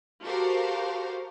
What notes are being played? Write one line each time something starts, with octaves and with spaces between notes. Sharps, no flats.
F#4 G4 A4 A#4 C5 F5